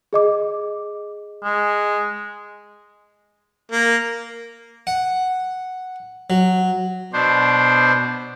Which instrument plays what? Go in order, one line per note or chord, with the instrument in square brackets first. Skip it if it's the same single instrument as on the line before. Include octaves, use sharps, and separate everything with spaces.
[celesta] G#4 D#5 D6
[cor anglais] G#3
[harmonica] A#3
[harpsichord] F#5
F#3
[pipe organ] B2 D4 C5